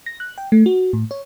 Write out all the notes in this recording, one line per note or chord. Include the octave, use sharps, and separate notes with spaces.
A#6
F#6
G5
A3
F#4
A2
C#5